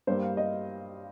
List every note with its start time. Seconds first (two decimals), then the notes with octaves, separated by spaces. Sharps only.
0.07 G2 G3 A#3 C5
0.23 F5
0.37 D#5